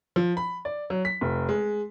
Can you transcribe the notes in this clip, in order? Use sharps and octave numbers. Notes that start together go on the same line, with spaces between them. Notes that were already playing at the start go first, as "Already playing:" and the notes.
F3
B5
D5
F#3
B6
F1
G#3